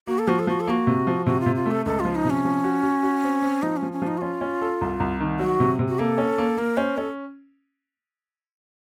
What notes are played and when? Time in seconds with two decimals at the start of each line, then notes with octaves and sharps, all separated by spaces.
0.07 A#3 F#4
0.19 A4
0.27 F3 F#4
0.39 A4
0.47 F3 F#4
0.60 A4
0.67 A#3 F#4
0.87 C3
1.07 F3
1.26 C3 F#4
1.40 F4
1.46 C3
1.55 F4
1.66 A3
1.71 A4
1.85 C#2 A4
2.00 F4
2.05 F3
2.15 D#4
2.25 C3
2.30 C#4
2.45 F3
2.64 F#4
2.83 F#4
3.03 F#4
3.24 C4
3.42 C4
3.62 F3 D#4
3.77 C#4
3.82 F3
3.92 C#4
4.02 F3
4.07 D#4
4.17 F#4
4.21 C#4 F4
4.41 C#4
4.62 A4
4.81 C2
5.00 C2
5.20 D#3
5.39 F#3 F#4
5.60 C3
5.79 C3
5.88 F#4
5.99 A#3 A4
6.18 C#4
6.38 A#3
6.57 A#3 A#4
6.77 C#4 C5
6.97 C#4 A4